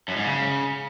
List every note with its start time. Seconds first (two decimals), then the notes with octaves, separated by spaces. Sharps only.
0.08 F#2
0.16 G#2
0.24 C#3